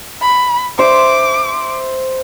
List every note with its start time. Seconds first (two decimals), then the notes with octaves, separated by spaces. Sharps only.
0.21 B5
0.79 C5 E5 D6